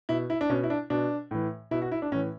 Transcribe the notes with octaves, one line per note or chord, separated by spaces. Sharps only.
B2 E4
E4
D4
B2 C#4
E4
D4
B2 D4
A2 E3
B2 E4
F#4
E4
D4
A2 E3 C#4